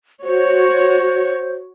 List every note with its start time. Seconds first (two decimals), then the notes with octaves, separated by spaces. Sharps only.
0.24 F#4 C5 C#5